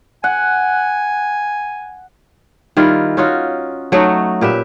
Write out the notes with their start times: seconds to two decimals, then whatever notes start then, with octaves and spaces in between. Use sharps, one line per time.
0.24 F#5 G#5
2.77 D#3 G3 E4 F4
3.17 C#4 D#4 F4 F#4
3.92 F#3 A3 D#4 F#4
4.41 A#2 G4 B4 E5